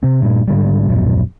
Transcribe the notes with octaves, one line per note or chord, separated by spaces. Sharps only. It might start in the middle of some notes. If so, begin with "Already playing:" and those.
C3 C4
G2 A#2
G#2 D3 G3
D#1 A#1 F#2 B2